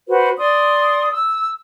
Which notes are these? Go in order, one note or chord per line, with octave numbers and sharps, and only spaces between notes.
F#4 B4 C5
D5 C6 D#6
E6